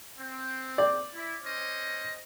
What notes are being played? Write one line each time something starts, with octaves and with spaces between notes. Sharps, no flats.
C4
D5
E4
C#4 C5 D#5